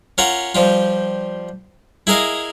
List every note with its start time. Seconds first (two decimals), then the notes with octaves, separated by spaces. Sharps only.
0.18 C#4 F4 A#4 F#5
0.55 F3 G3 F4
2.07 E4 G#4 A#4 D#5 F5